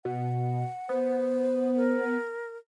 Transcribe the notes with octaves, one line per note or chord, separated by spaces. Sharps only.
B2 F#5
B3 C5
A#4